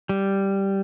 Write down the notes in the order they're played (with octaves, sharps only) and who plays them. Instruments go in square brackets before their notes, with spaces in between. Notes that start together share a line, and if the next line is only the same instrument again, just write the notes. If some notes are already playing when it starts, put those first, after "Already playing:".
[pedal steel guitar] G3